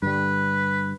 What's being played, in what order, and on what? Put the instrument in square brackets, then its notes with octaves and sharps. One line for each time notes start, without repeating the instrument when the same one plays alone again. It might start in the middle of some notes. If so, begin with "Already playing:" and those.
[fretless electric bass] G2 D3 G3 [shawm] B4